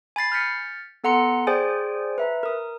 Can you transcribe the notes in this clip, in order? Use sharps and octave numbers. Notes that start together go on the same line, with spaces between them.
G#5 B5 A6 C7
F6 G6 A6 B6 C#7
B3 A4 F#5 A#5 C6 C#7
G#4 C5 D5 G5 G#5
B4 E5 A#5
A#4 D#6